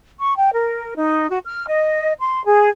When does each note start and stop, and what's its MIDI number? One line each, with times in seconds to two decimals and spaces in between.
0.20 0.33 85
0.37 0.51 79
0.53 0.94 70
0.96 1.29 63
1.29 1.39 66
1.45 1.65 89
1.67 2.12 75
2.20 2.42 84
2.45 2.69 68